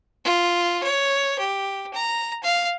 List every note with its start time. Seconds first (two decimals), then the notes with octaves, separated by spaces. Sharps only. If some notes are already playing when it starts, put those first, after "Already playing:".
0.25 F4
0.83 C#5
1.39 G4
1.93 A#5
2.44 F5